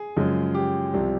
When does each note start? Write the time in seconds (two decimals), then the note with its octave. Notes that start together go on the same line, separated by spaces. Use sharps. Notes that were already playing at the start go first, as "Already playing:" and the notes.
Already playing: G#4
0.17 F#2 C#3 F3 G#3 C#4
0.55 G4
0.94 C2 C3 F3